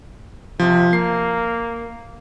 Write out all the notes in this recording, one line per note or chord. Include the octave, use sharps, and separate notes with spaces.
C3 F3
A#3 C7